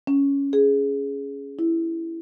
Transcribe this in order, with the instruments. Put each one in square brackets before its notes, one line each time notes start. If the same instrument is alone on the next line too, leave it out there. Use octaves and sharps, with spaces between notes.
[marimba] C#4
G#4
E4